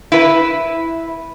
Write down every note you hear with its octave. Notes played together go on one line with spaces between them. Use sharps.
E4 B4